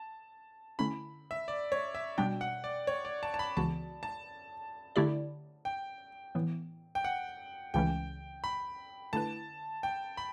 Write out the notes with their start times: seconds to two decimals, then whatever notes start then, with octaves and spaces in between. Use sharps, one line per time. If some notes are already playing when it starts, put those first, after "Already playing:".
Already playing: A5
0.79 D3 A3 C#4 E4 B5
1.31 E5
1.48 D5
1.72 C#5
1.95 E5
2.18 B2 G3 D4 G5
2.41 F#5
2.64 D5
2.87 C#5
3.05 D5
3.23 A5
3.34 A5
3.39 B5
3.57 C#2 C#3 E3 B3 F#4 A5
4.03 A5
4.96 D3 A3 E4 G4 D5
5.65 G5
6.35 A2 E3 B3
6.95 G5
7.04 F#5
7.74 C#2 C#3 E3 A3 C#4 G5
8.44 B5
9.13 D3 A3 E4 B4 A5
9.83 G5
10.17 B5